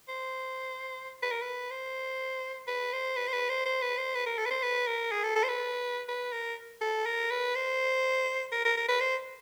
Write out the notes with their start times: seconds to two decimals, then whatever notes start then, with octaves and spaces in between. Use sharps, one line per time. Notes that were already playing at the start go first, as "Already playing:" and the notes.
0.08 C5
1.23 B4
1.32 A#4
1.42 B4
1.70 C5
2.68 B4
2.93 C5
3.16 B4
3.27 C5
3.33 B4
3.49 C5
3.66 C5
3.82 B4
3.97 C5
4.14 B4
4.26 A#4
4.38 A4
4.46 B4
4.50 C5
4.62 B4
4.87 A#4
5.11 G#4
5.23 A4
5.36 A4
5.43 C5
5.48 B4
6.09 B4
6.33 A#4
6.81 A4
7.06 A#4
7.31 B4
7.55 C5
8.52 A#4
8.65 A#4
8.77 A#4
8.88 B4
9.00 C5